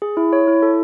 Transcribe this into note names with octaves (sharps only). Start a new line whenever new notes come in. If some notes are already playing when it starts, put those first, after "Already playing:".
G#4
E4
C#5
E4
A4